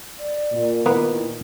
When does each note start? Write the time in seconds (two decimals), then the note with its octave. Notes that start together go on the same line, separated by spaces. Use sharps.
0.19 D5
0.52 A#2
0.86 A#2 D#3 A#3 B3 E4 B4